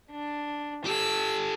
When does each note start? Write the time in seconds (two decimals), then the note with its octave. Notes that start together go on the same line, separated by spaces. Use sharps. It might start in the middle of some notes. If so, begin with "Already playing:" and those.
0.12 D4
0.86 G4 A4 E6